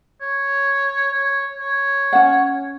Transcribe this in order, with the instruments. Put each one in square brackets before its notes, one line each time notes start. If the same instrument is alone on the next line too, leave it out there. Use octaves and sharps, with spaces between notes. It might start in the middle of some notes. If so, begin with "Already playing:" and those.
[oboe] C#5
C#5
C#5
[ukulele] C#4 F#5